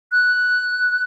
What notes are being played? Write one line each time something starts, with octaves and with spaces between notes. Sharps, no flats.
F#6